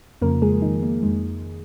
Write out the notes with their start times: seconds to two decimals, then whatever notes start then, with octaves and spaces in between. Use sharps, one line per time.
0.21 F2 C#3 F3 A#3 A#4
0.42 G#3 G#4
0.62 D#3 D#4
0.83 A#3
1.03 F2 D#3 G#3